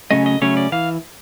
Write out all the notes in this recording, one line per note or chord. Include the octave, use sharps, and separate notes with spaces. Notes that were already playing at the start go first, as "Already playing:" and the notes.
C#3 F#3 A3 C#4 D#5
D#5
C#3 F#3 A3 C#4 C#5
D5
E3 F5